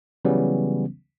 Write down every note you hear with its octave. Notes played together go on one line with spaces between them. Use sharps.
C#3 E3 F#3 G3 B3 C#4